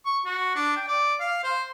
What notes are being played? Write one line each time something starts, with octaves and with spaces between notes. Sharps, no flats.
C#6
F#4
D4
G5
D5
F5
C5